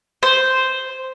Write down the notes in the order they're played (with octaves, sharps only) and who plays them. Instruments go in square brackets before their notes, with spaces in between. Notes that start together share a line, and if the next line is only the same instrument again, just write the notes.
[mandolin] C5